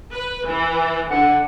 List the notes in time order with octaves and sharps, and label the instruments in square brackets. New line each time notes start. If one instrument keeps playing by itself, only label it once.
[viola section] B4
E3
[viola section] D3 [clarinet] F#5